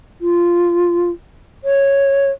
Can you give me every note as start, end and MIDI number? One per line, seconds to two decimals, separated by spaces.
0.21 1.10 65
1.64 2.31 73